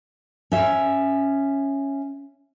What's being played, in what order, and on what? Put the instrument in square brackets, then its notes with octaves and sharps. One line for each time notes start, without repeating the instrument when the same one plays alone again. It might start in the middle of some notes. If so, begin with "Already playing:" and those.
[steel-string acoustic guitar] C#4 E5